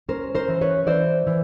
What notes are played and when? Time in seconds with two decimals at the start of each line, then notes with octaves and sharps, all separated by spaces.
0.09 C#4 A#4 C5
0.35 A#4 C5
0.48 E3
0.61 B4 C#5
0.87 E3 C5 D5
1.27 E3